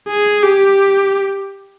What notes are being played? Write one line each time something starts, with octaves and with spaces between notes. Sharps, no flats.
G#4
G4